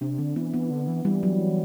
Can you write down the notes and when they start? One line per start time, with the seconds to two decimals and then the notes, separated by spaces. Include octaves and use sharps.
0.01 C3 D4
0.18 D3 C4
0.36 E3 B3
0.54 B3
0.70 D3
0.88 E3
1.05 E3 G3
1.23 F#3